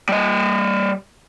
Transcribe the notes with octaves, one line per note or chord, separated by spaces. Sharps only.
G3 D#5